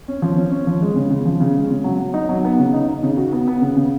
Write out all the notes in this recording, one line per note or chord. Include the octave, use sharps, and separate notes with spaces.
C#4
F3
C#4
C#4
F3
G#3
C#3
C#3
F3
C#3
G#3
C#3
F#3
F#3
D#4
F#3
B3
C#3
D#4
D#4
C#3
F#4
B3
B3
C#3
C#3